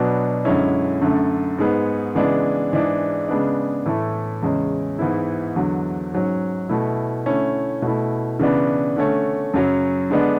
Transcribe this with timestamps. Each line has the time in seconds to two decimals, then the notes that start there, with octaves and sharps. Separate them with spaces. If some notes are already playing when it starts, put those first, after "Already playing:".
Already playing: B2 F#3 B3 D4
0.45 F#2 D3 G#3 C#4 E4
1.01 F#2 D3 A3
1.58 G#2 G#3 B3
2.15 C#3 E3 G#3 B3 D4
2.72 G#2 E3 G#3 D4
3.28 C#3 G#3 B3 D4
3.86 A2 E3 A3
4.42 E2 C#3 G#3 C#4
4.99 G#2 E3 B3 E4
5.56 E2 D3 F#3
6.13 G#2 F#3 C#4
6.69 B2 A3 E4
7.26 D3 A3 C#4 E4
7.82 B2 A3 E4
8.39 C#3 E3 B3 D4
8.96 D3 A3 C#4
9.54 F#2 C#3 F#3 C#4
10.10 D3 G#3 B3 D4